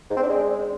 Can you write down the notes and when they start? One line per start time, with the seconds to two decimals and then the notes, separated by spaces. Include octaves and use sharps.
0.10 G#2
0.17 C4
0.23 D4
0.29 G#3